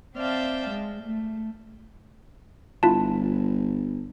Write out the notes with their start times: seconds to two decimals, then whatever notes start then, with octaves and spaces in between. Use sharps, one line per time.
0.16 C4 D5 E5 F5 G5 A5
0.69 G#3
1.02 A3
2.83 G1 E4 F4 A5